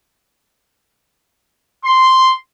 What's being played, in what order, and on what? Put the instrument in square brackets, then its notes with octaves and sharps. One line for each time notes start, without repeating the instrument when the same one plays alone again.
[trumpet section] C6